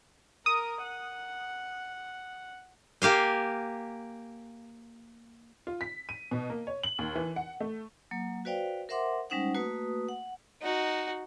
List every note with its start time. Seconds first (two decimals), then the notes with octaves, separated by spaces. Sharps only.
0.46 A#4 D#6
0.83 F#5
3.02 A#3 G4 F5 G#5
5.67 F4
5.81 B6
6.09 D#7
6.31 B2
6.50 A#3
6.67 C#5
6.83 F#7
6.99 D#2
7.15 E3
7.36 F#5
7.60 A3
8.11 F#3 A#3
8.45 F#4 B4 C5 D5 F5 G5
8.89 A#4 C5 E5 F#5 C6 D6
9.30 G3 G#3 C#4 D#4 C5 F#5
9.55 A3 A#3 F#4 B4 D#6
10.09 F#5
10.61 D#4 F#4